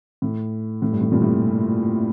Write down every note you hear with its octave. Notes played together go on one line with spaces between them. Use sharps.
A2
A2
G2
A2
G2 A#2
A2 C3